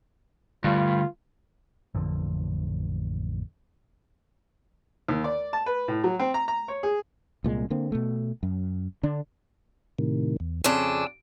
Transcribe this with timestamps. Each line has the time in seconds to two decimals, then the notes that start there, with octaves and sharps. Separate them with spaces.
0.64 G2 D3 A3 F4
1.95 A1 F2 D3 F3
5.08 D#2
5.24 D5
5.53 A5
5.66 B4
5.88 A2
6.04 F#3
6.19 C4
6.34 A#5
6.48 A#5
6.68 C#5
6.83 G#4
7.44 C2 A#2 G#3
7.70 D3 A#3 C4
7.92 B2 A3
8.43 F#2
9.03 D3 D4
9.99 A2 C3 D#3
10.40 E2
10.64 F2 C#3 D4 G#5 E6